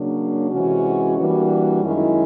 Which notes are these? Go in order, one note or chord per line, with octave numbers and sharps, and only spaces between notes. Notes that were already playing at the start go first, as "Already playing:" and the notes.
Already playing: C#3 F#3 A#3 D4
C3 E3 G#3 C#4 F#4
E3 G3 A#3 D4 F#4
F#2 D#3 G#3 C#4 E4